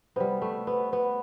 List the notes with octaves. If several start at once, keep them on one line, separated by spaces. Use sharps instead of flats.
C3 G3 B3
A3
B3
B3